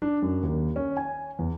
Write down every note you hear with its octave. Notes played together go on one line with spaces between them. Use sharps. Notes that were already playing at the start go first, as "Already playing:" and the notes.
D4
F#2
D#2
C#4
G#5
E2